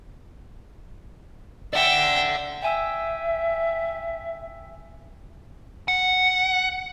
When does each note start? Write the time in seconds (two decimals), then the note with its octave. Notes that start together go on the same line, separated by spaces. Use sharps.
1.73 D5 E5 F#5 G5
2.62 E5 G5 G#5 E6
5.88 F#5